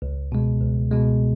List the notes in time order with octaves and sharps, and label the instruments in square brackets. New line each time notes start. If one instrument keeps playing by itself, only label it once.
[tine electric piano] C#2
B2 G#3
C#2
B2 G#3